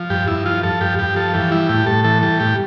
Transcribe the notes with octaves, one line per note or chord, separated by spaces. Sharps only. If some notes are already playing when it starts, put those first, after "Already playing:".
Already playing: F3
G2 G4
G2 E4
F3 F4
F3 A4
G2 G4
G2 G4
F3 A4
E3 G4
G3 E4
A2 G4
A2 A4
E3 A4
G3 A4
A2 G4